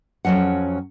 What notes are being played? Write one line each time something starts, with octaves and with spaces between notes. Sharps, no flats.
F2 D3 F#3 C#4 F#5